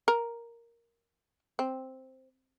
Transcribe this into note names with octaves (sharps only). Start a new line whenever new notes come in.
A#4
C4